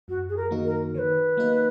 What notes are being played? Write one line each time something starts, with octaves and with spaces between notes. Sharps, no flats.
F#2 F#4
G#4
A#4
D#3 A#3 D#4 F#4
A#4
D#3 B4 C#5
F#3 A#3 D#4 A#4